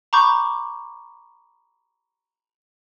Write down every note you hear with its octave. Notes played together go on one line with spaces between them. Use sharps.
A#5 B5 C#6 D6 G6